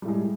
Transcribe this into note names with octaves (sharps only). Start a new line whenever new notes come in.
A2 G3 G#3